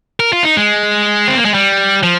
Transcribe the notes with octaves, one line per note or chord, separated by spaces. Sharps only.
A#4
F4
D#4
G#3
C4
A#3
G#3
G3
F3